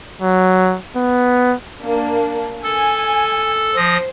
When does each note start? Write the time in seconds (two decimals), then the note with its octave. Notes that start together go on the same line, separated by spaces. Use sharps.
0.22 F#3
0.96 B3
1.84 A#3 D4
2.64 A4 G#5
3.76 F3 C5 D#6 A#6